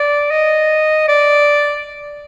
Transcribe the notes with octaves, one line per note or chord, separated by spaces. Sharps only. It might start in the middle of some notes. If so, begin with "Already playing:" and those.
Already playing: D5
D#5
D5